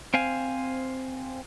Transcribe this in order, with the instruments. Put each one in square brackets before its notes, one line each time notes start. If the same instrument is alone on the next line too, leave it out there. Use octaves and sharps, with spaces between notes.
[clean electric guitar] C4 C5 F5 G#5